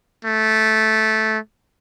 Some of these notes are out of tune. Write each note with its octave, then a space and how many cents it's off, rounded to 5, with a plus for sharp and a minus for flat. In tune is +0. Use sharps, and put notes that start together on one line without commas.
A3 -10